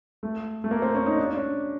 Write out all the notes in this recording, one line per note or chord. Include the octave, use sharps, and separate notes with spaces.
A3
A3
A#3
C4
C#4
D#4
D4
C#4
D4